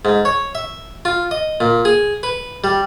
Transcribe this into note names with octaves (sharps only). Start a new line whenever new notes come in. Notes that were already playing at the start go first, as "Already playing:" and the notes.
G#2
C#5
E5
F4
D#5
A#2
G#4
B4
G3